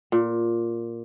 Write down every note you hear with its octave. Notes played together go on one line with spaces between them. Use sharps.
A#2